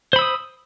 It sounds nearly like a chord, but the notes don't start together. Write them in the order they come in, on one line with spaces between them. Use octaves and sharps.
C5 B5 E6 D#6